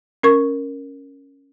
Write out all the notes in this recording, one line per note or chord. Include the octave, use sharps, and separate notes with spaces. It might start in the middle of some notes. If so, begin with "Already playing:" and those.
C#4 A#4 C#6